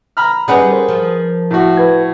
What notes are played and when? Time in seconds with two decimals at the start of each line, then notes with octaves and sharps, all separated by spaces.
0.17 A#5 B5 F6
0.48 G3 C#4 D#4 G#4 B4 F#5
0.69 A#4 C5
0.88 F3
1.51 A2 F#4
1.77 B4 G#6